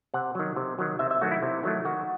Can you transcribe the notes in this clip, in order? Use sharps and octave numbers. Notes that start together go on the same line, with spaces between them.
C3 F#5
D#3 F#3
C3
D#3 F#3
C3 E5
E5
D#3 F#3 A3 F#4
E4
C3
D#3 F#3 A3
D#3 F#4